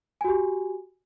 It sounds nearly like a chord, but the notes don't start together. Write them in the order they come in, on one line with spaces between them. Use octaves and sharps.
G#5 F#4 G4